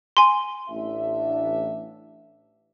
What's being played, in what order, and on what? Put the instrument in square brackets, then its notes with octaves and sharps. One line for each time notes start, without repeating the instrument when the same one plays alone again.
[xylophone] G#5 C6
[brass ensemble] A1 D4 E5